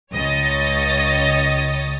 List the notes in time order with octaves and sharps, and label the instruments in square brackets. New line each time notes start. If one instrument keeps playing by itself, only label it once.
[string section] C#2 C#5 D#5 D#6 A6